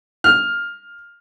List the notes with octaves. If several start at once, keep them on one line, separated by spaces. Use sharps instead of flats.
F6